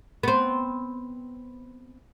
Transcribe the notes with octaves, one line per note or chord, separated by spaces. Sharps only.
B3 C4